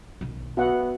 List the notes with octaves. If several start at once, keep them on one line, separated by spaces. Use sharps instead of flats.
B1 D#3
B3 F#4 E5 F#5